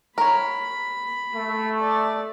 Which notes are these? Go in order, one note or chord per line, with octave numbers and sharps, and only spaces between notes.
A#4 C#5 B5
A3
D5